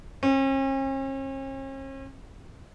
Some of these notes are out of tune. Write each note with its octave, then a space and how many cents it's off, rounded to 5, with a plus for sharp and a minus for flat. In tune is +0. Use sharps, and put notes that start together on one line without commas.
C#4 -45